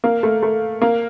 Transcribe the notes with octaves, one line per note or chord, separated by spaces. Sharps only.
A#3
A3
A3
A#3